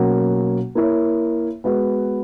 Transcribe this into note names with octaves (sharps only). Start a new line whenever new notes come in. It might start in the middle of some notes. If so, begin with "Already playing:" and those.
Already playing: B2 F#3 A#3 C#4 F#4
A#3 E4 A#4 C#5
G#3 B3 F#4 B4